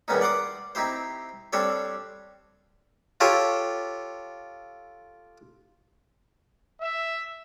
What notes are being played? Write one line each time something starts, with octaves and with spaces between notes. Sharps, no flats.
E2 D#3 G3 B3 C#4 D#4
D5 F#5 C6 D6 D#6
C4 D#4 E4 G4 C5
G3 C4 D4 G4 A4 C#5
F4 G4 A4 C#5
E5